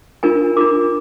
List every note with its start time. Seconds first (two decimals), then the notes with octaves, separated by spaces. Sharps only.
0.23 D4 F4 A#4 G#5
0.56 D4 F4 A#4 D6